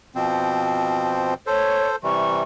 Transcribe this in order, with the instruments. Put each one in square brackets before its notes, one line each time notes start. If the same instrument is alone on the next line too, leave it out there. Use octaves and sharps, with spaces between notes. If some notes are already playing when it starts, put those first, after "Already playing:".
[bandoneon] B2 F3 C4
[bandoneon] A4 C5 [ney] C#5
[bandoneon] C3 E3 G3 [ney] C#6